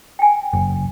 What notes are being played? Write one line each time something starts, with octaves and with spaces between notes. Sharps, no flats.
G5 G#5
F#1